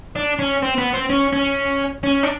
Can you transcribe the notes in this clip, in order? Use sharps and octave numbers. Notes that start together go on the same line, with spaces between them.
D4
C#4
C4
B3
C4
C#4
C#4
C#4
D4